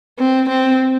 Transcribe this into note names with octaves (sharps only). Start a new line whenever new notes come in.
C4
C4